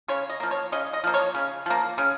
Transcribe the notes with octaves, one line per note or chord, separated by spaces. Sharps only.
C#3 C#5
D#5
F3 A#3
C#5
C#3 D#5
D#5
F3 A#3
C#5
C#3
F3 A#3
C#3